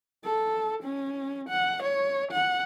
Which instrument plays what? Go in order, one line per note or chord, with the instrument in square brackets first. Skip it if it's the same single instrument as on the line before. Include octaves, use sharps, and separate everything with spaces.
[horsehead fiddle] A4
C#4
F#5
C#5
F#5